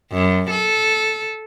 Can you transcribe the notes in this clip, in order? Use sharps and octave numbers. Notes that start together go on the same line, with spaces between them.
F#2
A4